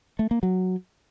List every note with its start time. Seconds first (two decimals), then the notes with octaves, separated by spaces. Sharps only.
0.19 A3
0.31 A#3
0.43 F#3